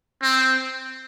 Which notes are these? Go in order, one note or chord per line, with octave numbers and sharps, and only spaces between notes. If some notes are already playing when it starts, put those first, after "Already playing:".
C4